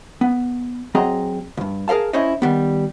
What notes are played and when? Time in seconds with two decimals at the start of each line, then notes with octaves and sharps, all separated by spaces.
0.21 B3
0.95 F#3 C4 G#4 D#5 A#5
1.57 C#2 G2
1.88 G#4 A#4 C5 F5 A5
2.13 C#4 E4 C5 C#5 D#5
2.42 D#3 G3 B3